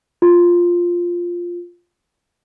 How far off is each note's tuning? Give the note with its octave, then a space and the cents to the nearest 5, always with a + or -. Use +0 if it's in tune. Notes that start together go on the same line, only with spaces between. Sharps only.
F4 +0